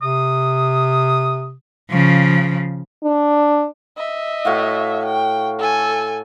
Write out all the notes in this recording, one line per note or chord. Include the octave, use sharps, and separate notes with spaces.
C3 D#6
C#3 F3
D4
D#5 E5
A2 F#4 F5
G5
A4 G#5